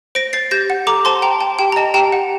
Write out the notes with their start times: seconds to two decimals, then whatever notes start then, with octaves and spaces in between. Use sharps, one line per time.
0.15 C5 A#6 D7
0.33 C5 A6 C7
0.51 G4 G6 A#6
0.70 F#5
0.87 A4 A#5 D6
1.05 C5 A5 C6
1.22 G5 A#5
1.41 G5 A5
1.59 G4 G5
1.72 A#5
1.76 D#5 A5
1.94 G4 G5 A#5
2.12 F#5